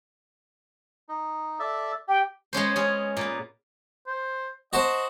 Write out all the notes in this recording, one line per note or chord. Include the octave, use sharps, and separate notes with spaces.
D#4
A4 D5 E5
G4 G5
G#3 B3 C#4 C5
C#4 G#4
A#2 B3
C5
F#4 C5 D#5 A5